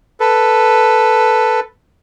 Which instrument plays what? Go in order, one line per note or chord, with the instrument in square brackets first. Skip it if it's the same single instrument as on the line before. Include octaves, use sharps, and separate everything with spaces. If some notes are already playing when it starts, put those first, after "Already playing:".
[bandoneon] A4 B4